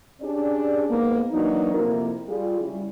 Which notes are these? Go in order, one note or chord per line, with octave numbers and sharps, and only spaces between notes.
C#4 D4 G4 G#4 D5
G#2 A#3 B3
E3 F#3 A#3 D4 D#4
F2 C3 A#3 E4 A#4
G3 F4 G#4
C#3 G3 E4